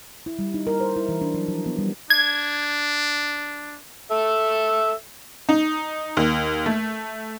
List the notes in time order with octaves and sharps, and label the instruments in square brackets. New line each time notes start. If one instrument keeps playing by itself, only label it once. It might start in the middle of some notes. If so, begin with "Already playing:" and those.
[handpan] E4
G3
D#4
A#4
C5
E4
E3
D4
F#3
F3
B3
G3
[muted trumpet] D4 [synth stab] G#6
[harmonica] A4 E5
[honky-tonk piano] D#4
D#2
A3